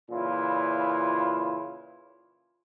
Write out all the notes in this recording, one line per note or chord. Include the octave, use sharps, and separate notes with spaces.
A#2 C#3 E3 E4 F4